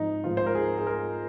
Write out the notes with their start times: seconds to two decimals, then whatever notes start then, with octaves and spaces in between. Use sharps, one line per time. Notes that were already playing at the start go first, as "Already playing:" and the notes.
Already playing: G#2 F3 G#3 C4 D#4
0.24 G#2 F3 G#3 C4 F4
0.37 C5
0.46 A#4
0.55 G#4
0.78 G#4
0.87 A#4